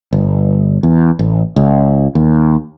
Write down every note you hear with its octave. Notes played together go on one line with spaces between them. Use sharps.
G1
E2
A1
C#2
D#2